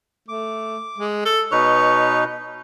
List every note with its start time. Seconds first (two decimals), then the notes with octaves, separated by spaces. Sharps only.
0.29 A3 D6
0.98 G#3
1.25 A4
1.52 B2 D#4 B4 C#5